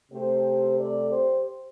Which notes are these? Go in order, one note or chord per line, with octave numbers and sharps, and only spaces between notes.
C3 A3 C4 G4 C5
A4 D5
G4 C5